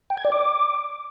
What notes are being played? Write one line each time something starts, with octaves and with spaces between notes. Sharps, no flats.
G5
G#6
D5
D6